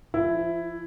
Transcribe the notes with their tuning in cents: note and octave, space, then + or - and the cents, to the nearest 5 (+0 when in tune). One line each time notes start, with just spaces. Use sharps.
F3 -30 E4 +10